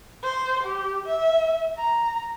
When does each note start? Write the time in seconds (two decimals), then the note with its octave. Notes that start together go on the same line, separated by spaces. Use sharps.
0.23 C5
0.63 G4
1.06 E5
1.77 A#5